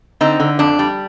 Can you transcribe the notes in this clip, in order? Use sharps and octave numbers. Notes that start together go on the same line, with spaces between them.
D3 C4 D#4
D3
F2 D4
G3